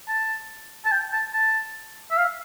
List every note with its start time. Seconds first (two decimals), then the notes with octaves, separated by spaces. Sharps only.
0.08 A5
0.86 A5
0.92 G5
1.13 A5
1.34 A5
2.11 E5
2.17 F5